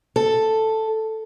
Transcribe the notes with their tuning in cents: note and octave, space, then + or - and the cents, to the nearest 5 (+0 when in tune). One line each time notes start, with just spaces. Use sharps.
A4 +0